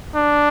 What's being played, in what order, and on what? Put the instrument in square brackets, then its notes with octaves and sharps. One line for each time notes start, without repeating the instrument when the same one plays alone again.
[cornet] D4